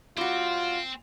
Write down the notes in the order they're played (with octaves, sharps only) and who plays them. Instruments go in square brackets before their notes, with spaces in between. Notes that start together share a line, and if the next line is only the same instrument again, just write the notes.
[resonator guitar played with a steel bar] G3 F#4 [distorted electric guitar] C4 [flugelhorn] F4